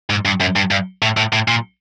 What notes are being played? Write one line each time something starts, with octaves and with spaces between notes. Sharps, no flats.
G#2
G2
F#2
G2
G2
A2
A2
A2
A#2